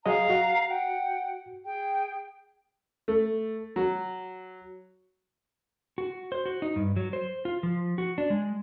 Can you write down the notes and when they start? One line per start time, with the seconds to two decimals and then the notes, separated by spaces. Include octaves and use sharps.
0.06 F#3 G#4 D#5 F5 A#5
0.30 F#4
0.70 F#5 G5
1.65 G#4 G5
3.08 A3
3.76 F#3
5.98 F#4
6.32 C5
6.46 F#4
6.62 D#4
6.76 G2
6.96 F#3
7.13 C5
7.45 F4
7.63 F3
7.98 F#4
8.18 D4
8.30 G#3